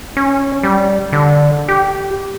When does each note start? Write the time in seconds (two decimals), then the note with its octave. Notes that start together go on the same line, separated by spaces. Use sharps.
0.17 C#4
0.63 G3
1.13 D3
1.68 G4